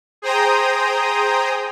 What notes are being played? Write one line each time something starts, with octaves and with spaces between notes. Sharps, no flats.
G#4 C5 G5 A#5 D#6